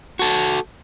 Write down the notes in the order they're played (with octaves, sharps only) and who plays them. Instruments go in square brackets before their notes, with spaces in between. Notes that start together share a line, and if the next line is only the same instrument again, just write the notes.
[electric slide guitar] F#4 A4